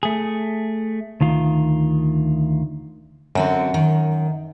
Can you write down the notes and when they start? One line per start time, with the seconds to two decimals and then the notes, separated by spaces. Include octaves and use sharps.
0.03 A3 G#4
1.21 D2 D#3 F4
3.35 F#2 D3 C4 F#4
3.74 D#3